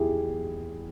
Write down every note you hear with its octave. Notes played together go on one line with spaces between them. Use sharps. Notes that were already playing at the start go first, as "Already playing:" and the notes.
Already playing: E2 E4 G4 G#4